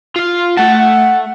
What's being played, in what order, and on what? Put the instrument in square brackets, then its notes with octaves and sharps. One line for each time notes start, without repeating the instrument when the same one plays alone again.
[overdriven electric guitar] F4 F5
[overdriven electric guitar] A3 A5 [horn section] F#5